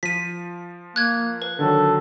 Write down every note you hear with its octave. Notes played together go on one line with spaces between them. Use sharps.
F3 B6 D#7
A#3 F#6 G#6
B4
D3 D#3 F#3 A4